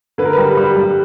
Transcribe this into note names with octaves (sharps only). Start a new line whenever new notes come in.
D3 B4
A#4
G3 B4
G3
G3